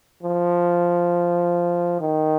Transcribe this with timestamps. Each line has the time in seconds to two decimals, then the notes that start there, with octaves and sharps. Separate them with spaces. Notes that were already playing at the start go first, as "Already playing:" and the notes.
0.23 F3
2.01 D#3